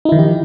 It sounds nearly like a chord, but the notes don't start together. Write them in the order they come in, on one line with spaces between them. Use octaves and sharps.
D#4 E4 D#3 F3 G4